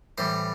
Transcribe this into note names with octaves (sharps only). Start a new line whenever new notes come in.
A2 E3 G3 C5